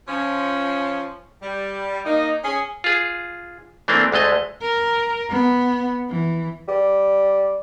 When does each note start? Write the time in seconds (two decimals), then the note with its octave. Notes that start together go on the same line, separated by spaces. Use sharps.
0.08 F3 C#4
1.42 G3
2.05 A#3 D#4
2.43 C#4 G#4
2.84 F4 G#4
3.88 E3 A3 A#3 C4 D4
4.12 D2 G#3 A3 D#5
4.61 A#4
5.29 B3
6.10 E3
6.68 G3